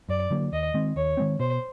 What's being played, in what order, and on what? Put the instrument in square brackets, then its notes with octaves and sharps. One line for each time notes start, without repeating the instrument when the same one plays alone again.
[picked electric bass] F#2 [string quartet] D5
[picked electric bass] D3 F#3 A#3
[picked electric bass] D#2 [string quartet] D#5
[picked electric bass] D#3 G#3 C4
[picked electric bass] D#2 [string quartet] C#5
[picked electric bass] D#3 G#3 C4
[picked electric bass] B2 [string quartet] C5